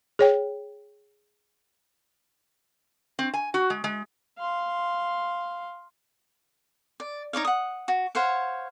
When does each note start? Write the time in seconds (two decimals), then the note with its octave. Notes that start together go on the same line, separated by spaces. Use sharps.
0.19 G#4 C#5 G5
3.19 C4
3.34 G#5
3.54 F#4
3.70 G#3
3.84 G#3
4.38 F5 C6
7.00 D5
7.33 D#4 C#5 D5 F5
7.45 F#5 D#6
7.88 F#4
8.15 C5 C#5 F5 F#5